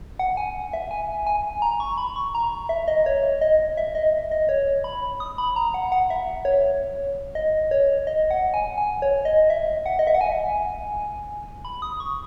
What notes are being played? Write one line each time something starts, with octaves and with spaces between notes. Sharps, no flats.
F#5
G#5
E5
G#5
G#5
A#5
C#6
B5
C#6
A#5
E5
D#5
C#5
D#5
E5
D#5
D#5
C#5
B5
D#6
B5
A#5
F#5
F#5
E5
C#5
D#5
C#5
D#5
F#5
G#5
G#5
C#5
D#5
E5
F#5
D#5
E5
F#5
G#5
B5
D#6
C#6